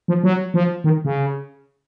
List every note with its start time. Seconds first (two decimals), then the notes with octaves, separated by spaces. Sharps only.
0.08 F3
0.24 F#3
0.54 F3
0.84 D#3
1.05 C#3